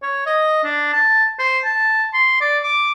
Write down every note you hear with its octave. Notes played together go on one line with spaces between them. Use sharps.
C#5
D#5
D4
A5
C5
A5
C6
D5
D6